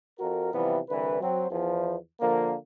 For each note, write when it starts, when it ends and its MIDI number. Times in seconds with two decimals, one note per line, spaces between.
0.19 0.50 41
0.19 0.50 66
0.19 0.50 70
0.53 0.78 48
0.53 0.78 52
0.53 0.78 53
0.53 0.78 55
0.53 0.78 59
0.89 1.20 36
0.89 1.20 50
0.89 1.20 52
0.89 1.20 71
1.21 1.49 54
1.21 1.49 60
1.50 1.95 40
1.50 1.95 53
2.20 2.54 50
2.20 2.54 53
2.20 2.54 58